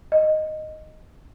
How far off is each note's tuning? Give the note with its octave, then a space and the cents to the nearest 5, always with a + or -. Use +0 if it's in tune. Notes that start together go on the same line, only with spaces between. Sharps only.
D#5 -5